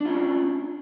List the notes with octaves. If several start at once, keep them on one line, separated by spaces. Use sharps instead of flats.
C#4 D4 F4